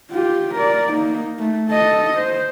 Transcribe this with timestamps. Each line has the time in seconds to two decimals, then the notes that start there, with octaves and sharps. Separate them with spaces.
0.11 F4 G4
0.55 A#4 D5
0.92 A#3 D#4
1.39 A3
1.69 A4 D#5
2.18 C5